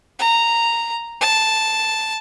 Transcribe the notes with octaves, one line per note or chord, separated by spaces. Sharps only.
A#5
A5